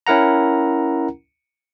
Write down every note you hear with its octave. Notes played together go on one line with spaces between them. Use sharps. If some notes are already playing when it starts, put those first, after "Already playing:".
C#4 E4 A#4 F#5 A#5